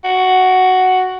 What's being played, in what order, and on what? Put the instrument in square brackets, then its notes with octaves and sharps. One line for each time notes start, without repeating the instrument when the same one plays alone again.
[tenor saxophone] F#4